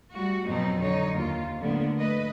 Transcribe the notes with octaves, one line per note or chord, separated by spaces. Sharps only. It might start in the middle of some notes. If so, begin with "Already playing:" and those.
G3 A3 F#4
F2 B2 F#3 C4 D#4
D3 F#3 D#4 C#5
D#2 F4
A2 D3 F3 A#3 B3
A3 B4 D#5